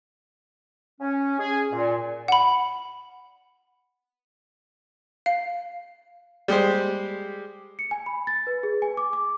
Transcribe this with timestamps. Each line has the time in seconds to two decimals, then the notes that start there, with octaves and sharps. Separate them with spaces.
1.01 C#4
1.39 G#4
1.73 A#2
2.28 F#5 B5
5.26 F5
6.48 G3 G#3 G4 C5
7.79 C#7
7.91 G#5
8.06 B5
8.27 A6
8.47 B4
8.63 G#4
8.82 G#5
8.97 D6
9.13 D6